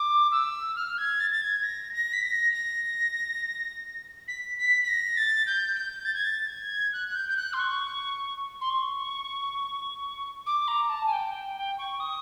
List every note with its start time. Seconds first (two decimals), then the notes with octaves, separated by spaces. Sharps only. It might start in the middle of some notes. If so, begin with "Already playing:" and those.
Already playing: D6
0.31 E6
0.76 F6
0.98 G#6
1.20 A6
1.31 A6
1.41 G#6
1.63 A#6
1.93 A#6
2.13 B6
2.22 A#6
2.52 A#6
4.28 B6
4.58 B6
4.83 B6
4.88 A#6
5.17 A6
5.46 G6
5.75 G6
6.05 A6
6.14 G#6
6.24 A6
6.48 G#6
6.93 F#6
7.08 F#6
7.15 G6
7.28 G6
7.36 F#6
7.53 C6
7.59 C#6
8.61 C6
8.70 C#6
10.46 D6
10.67 A#5
10.89 A5
11.06 G#5
11.12 G5
11.33 G5
11.56 G5
11.78 C#6
12.00 D#6